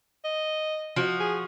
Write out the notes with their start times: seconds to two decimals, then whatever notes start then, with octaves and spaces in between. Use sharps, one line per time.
0.24 D#5
0.96 F3 F#4
1.20 G#4